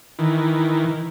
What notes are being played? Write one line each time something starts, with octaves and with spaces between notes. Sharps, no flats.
D#3 E3